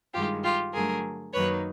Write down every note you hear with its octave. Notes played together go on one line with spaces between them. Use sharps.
G2 D#3 G#3 F4 G4
F4 G4
G2 D3 F#3 A3 G#4 A#4
F#2 D#3 F#3 A#3 D#4 B4 C#5